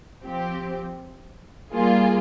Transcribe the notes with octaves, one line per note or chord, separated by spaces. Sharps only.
F3 C4 G4
G3 A#3 F4 G#4